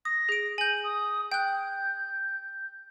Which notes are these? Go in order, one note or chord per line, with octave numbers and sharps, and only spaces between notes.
D#6 A#6
G#4 D7
G#5 G6 F#7
D#6
G5 F#6 G6